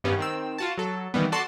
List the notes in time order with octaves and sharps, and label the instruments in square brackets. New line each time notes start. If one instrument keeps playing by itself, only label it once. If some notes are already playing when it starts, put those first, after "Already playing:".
[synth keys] G2 D#3 G3 B3 C#4
D#3 C4 E6
F4 F#4 A5
F#3 A4
D#3 E3 G3 B3
F#4 A4 D5 A5 C6